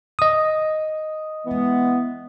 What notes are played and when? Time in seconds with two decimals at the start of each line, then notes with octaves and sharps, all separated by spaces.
0.19 D#5 D#6
1.46 E3 G#3 B3